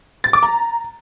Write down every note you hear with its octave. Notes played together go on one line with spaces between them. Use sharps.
A6
D6
A#5